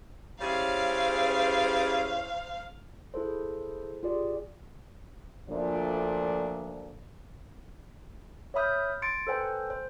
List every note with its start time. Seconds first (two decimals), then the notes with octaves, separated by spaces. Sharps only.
0.41 G3 C#4 E4 G#4 C5 F5
3.14 E4 G#4 A4 C5
4.03 F4 G4 G#4 D5
5.49 D2 A#2 F3 A3 D4
8.54 C#5 E5 B5 D#6 F6 G6
9.02 C6 G#6 A6 C#7 D7
9.27 A4 B4 C5 G5 G#5
9.70 C5